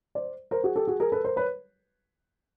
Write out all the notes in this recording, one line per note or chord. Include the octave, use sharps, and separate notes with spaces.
C5 D5
A#4 C5
F#4 G#4
G4 A4
F#4 G#4
G#4 A#4
A4 B4
A#4 C5
B4 C#5